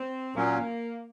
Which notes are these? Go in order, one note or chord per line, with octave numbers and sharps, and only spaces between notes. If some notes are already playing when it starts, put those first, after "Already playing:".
Already playing: C4
A#2 F#3 A#3 C#4